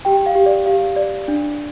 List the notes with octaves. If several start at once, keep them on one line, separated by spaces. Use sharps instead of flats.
G4 G5
F5
G4
D5
G4 F5
D5
D4